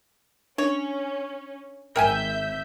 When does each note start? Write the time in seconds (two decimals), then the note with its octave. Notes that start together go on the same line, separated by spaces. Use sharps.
0.58 C#4 D4 C#5
1.96 G#1 A#4 E5 G5 G#5 G6